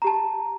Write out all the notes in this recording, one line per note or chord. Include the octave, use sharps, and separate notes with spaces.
G4 A5 A#5